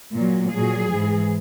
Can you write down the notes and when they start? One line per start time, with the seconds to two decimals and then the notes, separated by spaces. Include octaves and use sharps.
0.13 A#2 F#3
0.51 F#3 G#4
0.57 A#2
0.90 G#2 E3